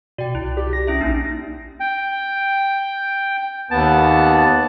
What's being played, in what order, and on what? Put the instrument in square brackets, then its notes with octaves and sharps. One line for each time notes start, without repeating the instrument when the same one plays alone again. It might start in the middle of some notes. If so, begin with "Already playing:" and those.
[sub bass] B2 [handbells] F#4 G5 [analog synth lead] D5
[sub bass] C2 [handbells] E4
[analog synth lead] G4
A#6
[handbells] C#4 E4 E5
[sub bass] A#1 [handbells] A#3 D4 D#4
[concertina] G5
[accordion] D#2 B3 [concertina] A5